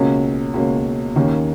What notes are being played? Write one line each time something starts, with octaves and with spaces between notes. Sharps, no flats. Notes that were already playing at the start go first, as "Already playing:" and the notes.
Already playing: C#2 B2 A#3 C#4
C#2 B2 A#3 C#4
D#2 D#3 A#3 C#4